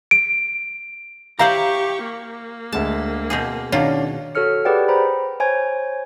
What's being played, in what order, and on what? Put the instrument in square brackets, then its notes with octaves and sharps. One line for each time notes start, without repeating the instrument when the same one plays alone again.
[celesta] D7
[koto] E4 C5 D5 [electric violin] G4 C#6 [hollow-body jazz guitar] F5 A#5
[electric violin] A#3
[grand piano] D2 G#3 [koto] A5
[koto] B2 C4 G#4
[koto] B2 D#3 F4 [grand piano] C#4 D4
[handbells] F#4 A4 C#5 F6 C#7
G4 G#4 B4 D5 F#5 G5
C5 A#5 B5
C5 C#5 G#5 G#6